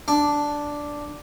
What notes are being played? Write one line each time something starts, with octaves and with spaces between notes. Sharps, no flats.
D4